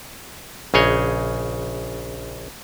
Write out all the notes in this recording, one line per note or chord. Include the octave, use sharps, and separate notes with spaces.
A#1 C#3 G#4 C#5 D#5